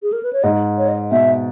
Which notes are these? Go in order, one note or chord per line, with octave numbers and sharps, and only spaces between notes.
G#4
A#4
B4
C#5
G#2 D#5
C#5
D#5
B2 E5